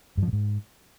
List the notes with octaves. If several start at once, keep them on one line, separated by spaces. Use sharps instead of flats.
G2
F3
A#2
G#2